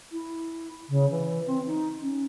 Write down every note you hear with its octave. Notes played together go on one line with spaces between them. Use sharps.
E4
C#3
E3
C4
D#4
C#4